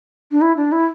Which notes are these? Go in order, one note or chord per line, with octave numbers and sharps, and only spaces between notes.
D4
E4
D4
E4